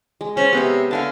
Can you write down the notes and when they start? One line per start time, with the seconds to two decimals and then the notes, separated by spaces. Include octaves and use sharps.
0.21 G#3
0.37 C#4 C5 C#5
0.53 C3 B3 D#5 E5
0.91 D3 F5 G#5 A5